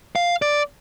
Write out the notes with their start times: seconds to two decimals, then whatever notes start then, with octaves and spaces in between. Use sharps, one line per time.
0.16 F5
0.42 D5